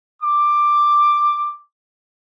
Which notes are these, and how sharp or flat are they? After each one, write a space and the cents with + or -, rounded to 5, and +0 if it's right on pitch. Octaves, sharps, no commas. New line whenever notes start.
D6 +10